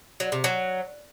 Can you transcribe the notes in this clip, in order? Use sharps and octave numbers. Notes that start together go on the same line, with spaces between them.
F#3
C3
F#3